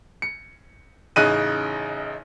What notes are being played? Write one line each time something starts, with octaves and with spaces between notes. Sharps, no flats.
C#7
A1 C#3 D#4 F#6 D#7